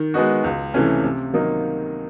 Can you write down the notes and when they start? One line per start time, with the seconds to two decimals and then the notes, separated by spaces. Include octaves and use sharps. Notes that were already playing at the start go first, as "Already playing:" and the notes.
Already playing: D#3
0.14 G#3 B3 D#4 F#4
0.44 C#2
0.74 C3 E3 A3 C#4
1.04 C3
1.33 D#3 F#3 A#3 D#4